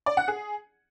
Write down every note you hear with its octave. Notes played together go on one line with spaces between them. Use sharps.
D5
F#5
G#4